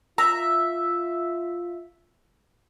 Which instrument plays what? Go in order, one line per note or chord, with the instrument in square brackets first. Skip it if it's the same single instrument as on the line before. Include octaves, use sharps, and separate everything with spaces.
[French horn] F4 [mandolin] E5 [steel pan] A#5